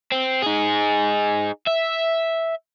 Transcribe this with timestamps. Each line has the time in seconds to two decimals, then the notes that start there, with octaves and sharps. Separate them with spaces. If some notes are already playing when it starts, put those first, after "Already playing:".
0.12 C4
0.42 D#4 G#4
1.67 E5